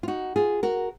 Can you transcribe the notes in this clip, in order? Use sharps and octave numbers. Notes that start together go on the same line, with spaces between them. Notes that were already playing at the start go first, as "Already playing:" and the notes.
F4
D#4 F#4
F4 G#4
F#4 A#4